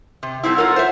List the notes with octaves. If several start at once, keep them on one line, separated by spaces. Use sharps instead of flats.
C3
G3 A3 C4 E4
F4 A4 A#4 C#5 F#5
C5 E5